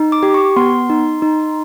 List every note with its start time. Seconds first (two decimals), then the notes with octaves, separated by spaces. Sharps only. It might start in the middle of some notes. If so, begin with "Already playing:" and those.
Already playing: D#4
0.12 D6
0.23 G4
0.34 C#6
0.56 B3 C6
0.90 D#4
1.22 D#4